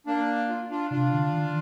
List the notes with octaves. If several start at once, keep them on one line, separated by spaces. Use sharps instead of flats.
A#3 D4
F4
D4 F4
C3 D4 F4
D3
D#3